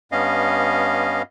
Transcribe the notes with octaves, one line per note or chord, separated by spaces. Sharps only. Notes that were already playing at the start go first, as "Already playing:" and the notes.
G2 B3 C#4 D#5 F5